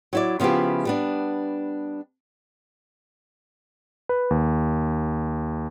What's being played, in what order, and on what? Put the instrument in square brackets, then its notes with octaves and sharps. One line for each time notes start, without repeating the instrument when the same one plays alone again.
[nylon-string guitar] F#3 E4 D5
C#3 F3 B3 E4 G4
G3 B3 D4
[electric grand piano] B4
D#2